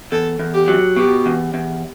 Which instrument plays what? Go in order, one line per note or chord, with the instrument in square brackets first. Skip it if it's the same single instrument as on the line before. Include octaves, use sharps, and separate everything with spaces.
[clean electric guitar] E2 [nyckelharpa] A4
[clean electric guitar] E2
[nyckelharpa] G4
[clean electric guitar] F#3
[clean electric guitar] B2 [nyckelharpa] G4
[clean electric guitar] E2
E2